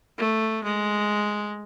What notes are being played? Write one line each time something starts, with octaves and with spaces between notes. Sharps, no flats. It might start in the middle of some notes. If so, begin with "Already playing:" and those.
A3
G#3